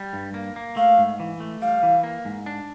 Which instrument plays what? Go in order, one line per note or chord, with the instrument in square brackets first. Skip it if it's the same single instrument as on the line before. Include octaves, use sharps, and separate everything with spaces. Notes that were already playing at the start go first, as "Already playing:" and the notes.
Already playing: [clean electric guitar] G3
G2
A#3
A#3
[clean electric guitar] A3 [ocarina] F5
[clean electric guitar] G#2
E3
A3
[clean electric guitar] G3 [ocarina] F5
[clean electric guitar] E3
A#3
G#2
D4